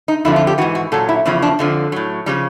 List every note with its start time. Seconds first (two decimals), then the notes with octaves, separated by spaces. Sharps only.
0.08 D#4
0.25 F2 D3 F3 E4
0.36 F4
0.47 G4
0.58 E3 F#4
0.62 G#2
0.75 F#4
0.92 A#2 F#3 A4
1.09 E4
1.26 E2 C#3 F3 E4
1.42 D4
1.59 F2 D3 F3
1.92 A2 F#3
2.26 C#3 F3 G3